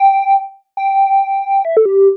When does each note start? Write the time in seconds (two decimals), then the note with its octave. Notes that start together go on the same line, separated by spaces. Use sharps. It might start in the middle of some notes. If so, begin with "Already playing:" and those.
Already playing: G5
0.77 G5
1.65 E5
1.77 A4
1.86 G4